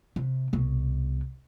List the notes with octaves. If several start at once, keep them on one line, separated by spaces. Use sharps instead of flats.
C3
C2 B2